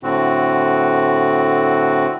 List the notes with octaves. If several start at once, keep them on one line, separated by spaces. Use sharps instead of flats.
A2 D3 C4 F#4